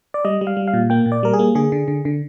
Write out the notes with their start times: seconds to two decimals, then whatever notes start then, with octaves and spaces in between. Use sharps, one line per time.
0.14 D5
0.25 G3 D#5
0.41 G3
0.47 F5
0.57 G3
0.68 F5
0.74 A#2
0.90 A#3 G5
1.06 A#2
1.12 D5
1.23 G3 A#4
1.33 G#4
1.39 A#3
1.55 D3 G#4
1.72 D3
1.88 D3
2.05 D3